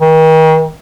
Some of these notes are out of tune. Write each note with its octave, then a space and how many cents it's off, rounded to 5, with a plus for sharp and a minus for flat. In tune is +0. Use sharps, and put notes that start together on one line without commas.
D#3 +40